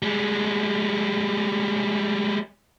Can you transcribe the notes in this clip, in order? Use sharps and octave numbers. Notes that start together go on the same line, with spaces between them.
G3 G#3